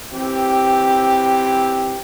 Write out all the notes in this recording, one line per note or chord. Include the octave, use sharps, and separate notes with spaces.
E3 C4 G4